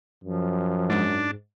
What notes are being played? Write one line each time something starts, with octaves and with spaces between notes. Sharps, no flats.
F#2 F3
G#2 D4